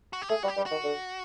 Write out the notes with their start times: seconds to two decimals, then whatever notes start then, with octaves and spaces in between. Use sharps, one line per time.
0.13 F#4
0.22 G4
0.29 A3 G#4
0.43 G3 F#4
0.48 G4
0.57 G3
0.66 F#4
0.71 D#3
0.84 D3